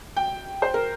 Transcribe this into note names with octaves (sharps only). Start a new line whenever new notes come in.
G5
C5
A#4